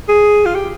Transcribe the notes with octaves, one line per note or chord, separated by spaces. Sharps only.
G#4
F4
G4